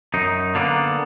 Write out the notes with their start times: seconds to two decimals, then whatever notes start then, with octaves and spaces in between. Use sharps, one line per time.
0.14 F#2 D#4
0.55 D3 A#3 B3